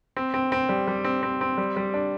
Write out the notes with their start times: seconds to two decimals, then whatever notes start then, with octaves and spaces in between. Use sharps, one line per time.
0.17 C4
0.34 C4
0.52 C4
0.69 G3
0.87 G3
1.05 C4
1.23 C4
1.41 C4
1.58 G3
1.76 G3
1.94 D4